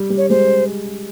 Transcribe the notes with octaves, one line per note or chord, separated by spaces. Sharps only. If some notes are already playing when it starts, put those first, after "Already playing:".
Already playing: G3
G3
C#5
G#3 C5